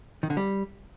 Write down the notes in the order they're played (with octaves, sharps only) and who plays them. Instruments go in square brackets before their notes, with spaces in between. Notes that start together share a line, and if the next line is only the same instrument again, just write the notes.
[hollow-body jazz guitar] D#3
D3
G3